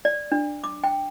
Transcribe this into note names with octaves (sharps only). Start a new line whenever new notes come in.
D5
D4
D6
G5